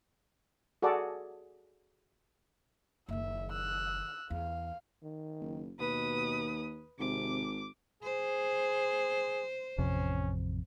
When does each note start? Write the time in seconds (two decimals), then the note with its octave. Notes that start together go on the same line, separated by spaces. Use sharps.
0.82 F#4 G#4 A4 D5
3.09 F#1 D#3 E5
3.52 E6 F#6
4.30 E2 F5
5.03 D#3
5.40 F#1
5.79 D#2 B2 B4 D#6
6.99 G#1 C3 D6
8.03 G#4 C5
9.78 A1 F2 C3 C#4